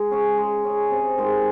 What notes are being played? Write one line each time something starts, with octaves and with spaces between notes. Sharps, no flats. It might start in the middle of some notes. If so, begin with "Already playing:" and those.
Already playing: G#3
C#4 G#4 C#5
G#3
C#4 G#4 C#5
C3
D#3 G#3